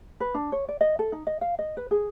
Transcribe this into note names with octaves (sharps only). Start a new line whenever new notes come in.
B4
D4
C#5
D5
D#5
A4
D#4
D#5
F5
D#5
B4
G#4